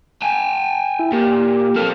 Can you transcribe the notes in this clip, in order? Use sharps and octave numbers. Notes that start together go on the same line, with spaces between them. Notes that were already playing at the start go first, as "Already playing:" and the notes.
G5 G#5
E4
A#2 A#3 G4
C4 A4 F6